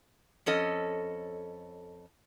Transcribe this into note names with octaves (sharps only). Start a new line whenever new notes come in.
F2 C#4 A4 D#5